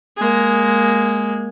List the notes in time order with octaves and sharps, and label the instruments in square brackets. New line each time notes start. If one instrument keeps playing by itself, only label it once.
[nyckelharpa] G#3 A#3